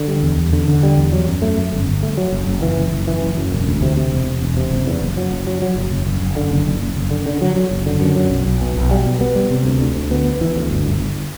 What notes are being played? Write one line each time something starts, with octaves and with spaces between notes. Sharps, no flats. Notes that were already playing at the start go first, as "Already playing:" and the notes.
Already playing: D3
G3
E2
E2
D3
D3
G3
E2
F#3
F#2
A3
F#2
G1
G1
A3
F#3
F#1
F#1
E3
F#1
F#1
E3
F#1
F#2
E1
D2
C3
C3
E1
E1
E1
C3
F#1
E2
F#1
F#3
F#1
F#3
F#3
F#1
F#1
F#1
F#1
D3
F#1
F#1
F#1
F#1
D3
D3
F#3
F#3
F#1
D3
F#2
F#3
B1
B1
B2
B1
G3
B2
B3
G3
C3
D2
D2
D2
B3
B3
E3
D2
G1
G1
G1